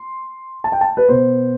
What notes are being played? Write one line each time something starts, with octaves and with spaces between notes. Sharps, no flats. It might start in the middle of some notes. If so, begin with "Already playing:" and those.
Already playing: C6
A5
G5
A5
B4
B2 B3 C5